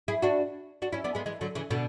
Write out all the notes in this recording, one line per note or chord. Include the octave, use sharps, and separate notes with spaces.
E4 G#4
D4 F#4
D4 F#4
C#4 E4
B3 D4
G#3 B3
E3 G#3
D3 F#3
C#3 E3
B2 D3